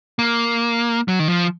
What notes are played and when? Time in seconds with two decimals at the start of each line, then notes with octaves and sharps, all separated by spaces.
0.19 A#3
1.08 F#3
1.19 D#3
1.28 F3